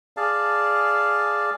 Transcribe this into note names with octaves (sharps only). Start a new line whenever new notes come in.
G#4 D5 F5 A5